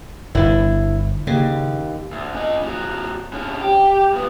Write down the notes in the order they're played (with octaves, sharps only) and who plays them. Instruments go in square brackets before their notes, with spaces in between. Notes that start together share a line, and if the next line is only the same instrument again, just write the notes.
[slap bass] G1 D3 [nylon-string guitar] E4
[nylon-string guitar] D#2 [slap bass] C#3
[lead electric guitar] D2
C#4 D#5
D#2 F#3
D3 C#4
G4
G2 B3